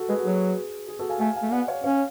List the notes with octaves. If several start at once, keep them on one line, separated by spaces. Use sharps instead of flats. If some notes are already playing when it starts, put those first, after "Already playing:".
Already playing: F#4 A4
G#3 G#4 B4
F#4
F#3 G#4
G#4
F#4 A4
F5 G#5
A3 F5 G#5
F5 G#5
A3
B3 D5 F#5
C#5 F5
C#4 C#5 F5